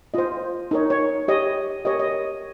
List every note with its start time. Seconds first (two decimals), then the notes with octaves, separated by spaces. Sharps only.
0.14 F4 C5 D#5
0.71 D#4 A#4 C#5
0.90 C#5
1.28 G4 C#5 D#5
1.85 G4 A#4 C#5 D#5
1.99 D#5